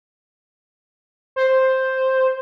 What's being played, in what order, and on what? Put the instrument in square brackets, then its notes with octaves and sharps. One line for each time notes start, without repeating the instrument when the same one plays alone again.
[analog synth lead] C5